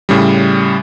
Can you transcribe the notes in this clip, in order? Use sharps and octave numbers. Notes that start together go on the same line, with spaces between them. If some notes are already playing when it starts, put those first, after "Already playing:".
A2 C#3 G3